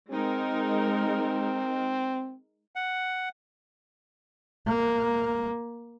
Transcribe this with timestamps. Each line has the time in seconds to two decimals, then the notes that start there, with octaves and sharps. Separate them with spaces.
0.11 G#3 C4 D#4 A#4
2.75 F#5
4.67 A#3